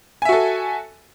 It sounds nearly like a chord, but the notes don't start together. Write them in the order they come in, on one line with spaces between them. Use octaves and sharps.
G#5 E5 F#4 A4